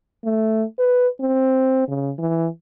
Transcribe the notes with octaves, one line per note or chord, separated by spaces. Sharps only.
A3
B4
C4
C#3
E3